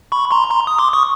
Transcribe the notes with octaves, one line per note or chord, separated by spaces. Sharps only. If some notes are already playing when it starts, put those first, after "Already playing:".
B5 C#6
A#5 C6
A#5 C6
D#6
C6 D6
C#6 D#6